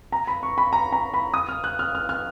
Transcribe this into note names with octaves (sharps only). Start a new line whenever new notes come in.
A#5
B5
C#6
B5
A#5
A#5
B5
D#6
F6
F#6
F6
F6
F6